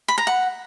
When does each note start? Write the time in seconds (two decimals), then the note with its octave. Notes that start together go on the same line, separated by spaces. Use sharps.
0.08 B5
0.18 A#5
0.27 F#5